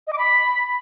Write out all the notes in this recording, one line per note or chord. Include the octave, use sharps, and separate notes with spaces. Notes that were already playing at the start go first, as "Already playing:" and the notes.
D#5
D6
B5